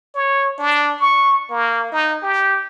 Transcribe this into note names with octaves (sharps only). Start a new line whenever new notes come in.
C#5
D4
C#6
A#3
D#4
G4